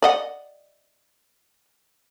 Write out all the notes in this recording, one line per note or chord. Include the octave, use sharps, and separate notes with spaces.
D5 D#5 F#5